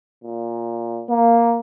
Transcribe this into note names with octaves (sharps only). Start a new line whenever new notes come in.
A#2
A#3